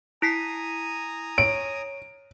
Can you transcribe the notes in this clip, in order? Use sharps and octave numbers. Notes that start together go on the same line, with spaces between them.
E4 G#5 A#5 D#6 B6 C7
C#5 D7